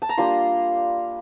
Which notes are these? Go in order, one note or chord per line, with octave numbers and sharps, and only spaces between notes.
A5
A#5
G3 A#3 D4 F4 C6